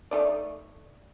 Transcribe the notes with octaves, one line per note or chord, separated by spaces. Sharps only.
A3 D#4 D5